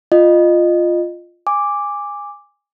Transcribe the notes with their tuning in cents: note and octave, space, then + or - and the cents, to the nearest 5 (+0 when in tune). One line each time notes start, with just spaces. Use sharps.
F4 +0 D#5 -20
G#5 -20 D6 +0